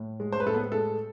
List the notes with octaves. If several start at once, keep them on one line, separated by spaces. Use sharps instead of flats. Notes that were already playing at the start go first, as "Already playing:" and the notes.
Already playing: A2
G#3
C5
B4
A2 A4
B3 B4
G#3 A4